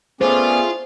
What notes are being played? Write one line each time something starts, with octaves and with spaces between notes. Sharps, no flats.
A3 B3 C#4 F4 G#4 C5 D5